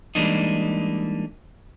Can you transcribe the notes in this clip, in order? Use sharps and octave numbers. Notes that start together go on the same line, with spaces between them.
E3 G3 G#3 A#3 D4 D#4